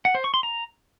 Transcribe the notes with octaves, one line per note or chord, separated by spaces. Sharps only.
F#5
C5
C#6
C6
A#5